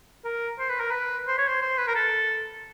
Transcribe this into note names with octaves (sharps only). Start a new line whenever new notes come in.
A#4
C5
B4
A#4
B4
C5
C#5
C5
C5
B4
A#4
A4